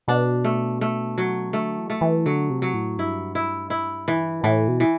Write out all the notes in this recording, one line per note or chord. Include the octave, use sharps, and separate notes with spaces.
B2 D4
A3
A3
F#3
D3 A3
E3
A3
E3
D3 F#3
C3
F#3
A2
G2 E4
E4
E4
E3
A2 E3
B2
E3